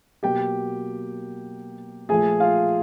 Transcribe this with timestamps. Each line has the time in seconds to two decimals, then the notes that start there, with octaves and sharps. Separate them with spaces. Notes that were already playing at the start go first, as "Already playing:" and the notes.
0.23 B2 F#3 A#3 G4 G5
2.09 A#2 F3 A3 G#4 G#5
2.40 F4 F5